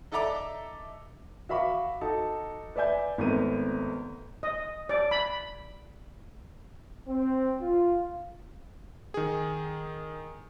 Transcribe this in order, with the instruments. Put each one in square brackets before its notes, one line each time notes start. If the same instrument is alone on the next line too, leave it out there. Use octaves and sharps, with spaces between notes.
[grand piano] D#4 A4 D5 E5 A#5 D6
[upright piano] F#4 E5 F5 B5 C#6 D6
D#4 F#4 A4 A5
B4 D5 E5 G#5 G6
G#1 A3 B3 C4 A#4 D#7
[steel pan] D#5
D5
B5
[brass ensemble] C4
F4
[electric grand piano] D#3 G#4